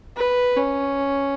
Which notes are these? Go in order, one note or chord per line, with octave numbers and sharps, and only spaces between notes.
B4
C#4